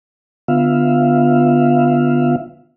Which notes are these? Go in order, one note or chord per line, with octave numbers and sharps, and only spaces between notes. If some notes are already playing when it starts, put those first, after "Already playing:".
D3 B3 F4 E5 F5